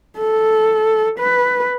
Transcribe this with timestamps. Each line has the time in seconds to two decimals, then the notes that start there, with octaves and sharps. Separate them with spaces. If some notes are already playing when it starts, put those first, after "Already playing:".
0.18 A4
1.19 B4